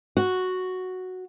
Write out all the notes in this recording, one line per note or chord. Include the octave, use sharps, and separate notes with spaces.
F#4